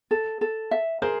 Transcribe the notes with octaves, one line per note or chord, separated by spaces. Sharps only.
A4
A4
E5
G#4 A#4 C5